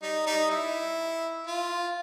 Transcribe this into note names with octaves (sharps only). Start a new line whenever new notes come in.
G3 D#4
G3 D#4
E4
F4